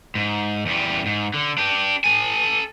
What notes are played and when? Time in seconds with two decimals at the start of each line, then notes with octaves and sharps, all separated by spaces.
0.15 G#2
0.66 E2 G3
1.06 G#2
1.34 D3
1.58 D4 G4
2.04 A4 G#5